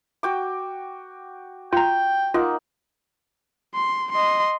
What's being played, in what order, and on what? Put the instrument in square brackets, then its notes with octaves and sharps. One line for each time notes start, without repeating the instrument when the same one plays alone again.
[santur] F#4 G5 D6
[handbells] F4 A#5 [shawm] G5
[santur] A#3 D#4 F#5 [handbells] F4
[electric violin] C6
D#5 C6